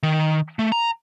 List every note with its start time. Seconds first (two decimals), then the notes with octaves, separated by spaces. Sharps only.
0.03 D#3
0.59 A3
0.72 A#5